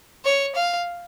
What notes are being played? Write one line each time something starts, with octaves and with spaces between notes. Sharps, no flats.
C#5
F5